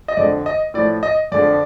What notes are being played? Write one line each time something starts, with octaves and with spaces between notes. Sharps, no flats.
D#5
F2 D3 F3 D5
D#5
A2 F3 D5
D#5
F2 D3 F3 D5